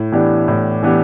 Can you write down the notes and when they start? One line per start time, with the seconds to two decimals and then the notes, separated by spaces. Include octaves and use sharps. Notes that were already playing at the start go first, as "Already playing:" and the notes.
Already playing: A2
0.12 E3 B3 D4 G4
0.48 A2
0.83 E3 B3 D4 G4